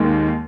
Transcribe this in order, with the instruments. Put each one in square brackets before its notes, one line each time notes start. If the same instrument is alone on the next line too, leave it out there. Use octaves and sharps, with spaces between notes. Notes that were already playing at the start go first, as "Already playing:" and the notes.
Already playing: [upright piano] D#2 D#3 G#3